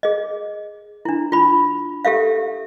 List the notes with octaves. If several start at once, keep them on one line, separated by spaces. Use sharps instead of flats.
G#4 D#5
D4 E4
F4 B5
G4 A4 E5 F5